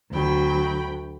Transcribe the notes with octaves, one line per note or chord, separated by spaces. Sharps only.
D2 F#3 G5 B5